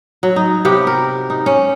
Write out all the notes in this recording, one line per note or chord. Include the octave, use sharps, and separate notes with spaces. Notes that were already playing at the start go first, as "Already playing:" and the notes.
F#3
D#4
C3 B3 G4
A#4
D#4
C#4